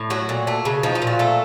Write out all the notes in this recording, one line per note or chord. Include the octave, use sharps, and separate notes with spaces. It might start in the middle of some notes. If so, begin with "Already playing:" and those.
Already playing: A2
F#3 F#4
A#2
A3
C#3
F3 D#4
F4
A#2
F#4
A3 A4